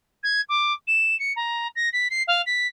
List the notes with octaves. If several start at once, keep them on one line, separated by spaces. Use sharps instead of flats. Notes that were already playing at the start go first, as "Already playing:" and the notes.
G#6
D6
E7
C#7
A#5
A#6
B6
C7
F5
B6